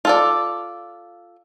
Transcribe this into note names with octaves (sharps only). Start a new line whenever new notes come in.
F4 A4 D5